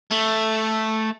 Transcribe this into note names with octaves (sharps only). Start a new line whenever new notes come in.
A3